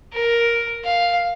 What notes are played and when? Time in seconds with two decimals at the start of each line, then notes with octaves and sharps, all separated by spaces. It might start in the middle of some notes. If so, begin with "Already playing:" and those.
0.14 A#4
0.85 F5